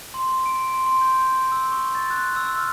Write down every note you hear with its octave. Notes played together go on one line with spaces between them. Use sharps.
C6
D7
C6
C6
G6
E6
C#6
A6
F#6
E6
F6